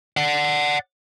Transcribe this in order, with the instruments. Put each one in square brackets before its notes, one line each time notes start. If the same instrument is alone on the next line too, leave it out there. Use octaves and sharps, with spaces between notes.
[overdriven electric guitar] D5 F#5